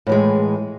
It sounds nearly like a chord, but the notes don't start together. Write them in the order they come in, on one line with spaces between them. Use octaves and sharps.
A2 E3 G#3